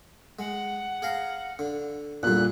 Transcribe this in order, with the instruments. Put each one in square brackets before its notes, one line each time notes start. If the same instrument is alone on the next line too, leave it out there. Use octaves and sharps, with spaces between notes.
[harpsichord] G#3 [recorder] F#5
[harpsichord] G#4 F5 A#5
D3
[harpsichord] E2 D3 [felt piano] A#2 G3 [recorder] F#6